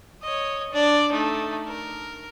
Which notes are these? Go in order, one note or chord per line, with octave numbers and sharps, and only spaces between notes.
C#5 D#5
D4 D5
A3 D#4
A#4